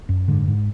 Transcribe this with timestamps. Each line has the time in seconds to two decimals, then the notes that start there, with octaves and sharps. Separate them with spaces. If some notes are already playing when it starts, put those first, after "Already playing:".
0.09 F#2
0.28 G#2 D3
0.48 G#2